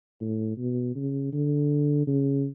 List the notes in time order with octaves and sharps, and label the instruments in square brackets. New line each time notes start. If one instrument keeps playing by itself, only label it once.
[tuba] A2
B2
C#3
D3
C#3